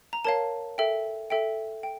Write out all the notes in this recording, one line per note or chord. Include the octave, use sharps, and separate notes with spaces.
A#5
A#4 C#5 F5 A5
A4 E5 G5
A4 E5 G5
G5